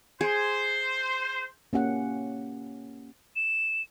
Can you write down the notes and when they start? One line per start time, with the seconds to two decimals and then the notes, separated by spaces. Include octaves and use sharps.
0.21 G#4 C5
1.73 A#3 C#4 G4 F#5
3.36 E7